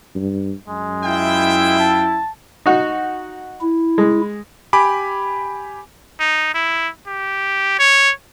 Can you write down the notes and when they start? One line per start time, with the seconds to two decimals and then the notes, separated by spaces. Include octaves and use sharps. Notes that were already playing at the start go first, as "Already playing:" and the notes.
0.15 G2
0.68 F#2 G#3
1.04 E4 F4 E5 G5
1.79 A5
2.66 D#4 F#4
3.61 E4
3.98 G#3
4.73 G4 G#5 B5 D6
6.20 D#4
6.54 E4
7.07 G4
7.79 C#5